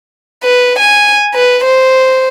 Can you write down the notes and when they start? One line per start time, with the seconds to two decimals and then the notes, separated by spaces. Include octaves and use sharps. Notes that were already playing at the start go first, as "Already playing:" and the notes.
0.43 B4
0.79 G#5
1.34 B4
1.65 C5